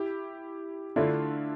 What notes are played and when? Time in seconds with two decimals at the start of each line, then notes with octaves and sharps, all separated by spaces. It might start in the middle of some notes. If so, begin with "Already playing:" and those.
Already playing: E4 G4
0.96 D3 A3 D4 E4 F4